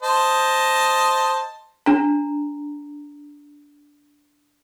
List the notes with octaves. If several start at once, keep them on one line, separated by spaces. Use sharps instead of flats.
C5 D#5 A5
D4 A#5